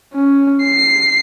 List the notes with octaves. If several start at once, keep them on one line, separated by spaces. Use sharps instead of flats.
C#4
C7